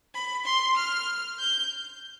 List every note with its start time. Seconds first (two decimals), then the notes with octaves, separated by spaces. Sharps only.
0.14 B5
0.46 C6
0.77 F6
1.39 G6